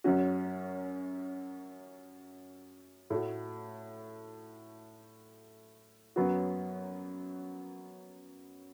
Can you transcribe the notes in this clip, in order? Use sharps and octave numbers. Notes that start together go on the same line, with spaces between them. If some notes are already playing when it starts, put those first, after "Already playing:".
F#2 F#3 C#4 F#4
A2 A3 F#4
F#2 F#3 B3 F#4